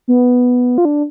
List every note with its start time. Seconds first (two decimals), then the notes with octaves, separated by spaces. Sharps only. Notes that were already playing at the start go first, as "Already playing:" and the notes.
0.08 B3
0.78 F4
0.85 D4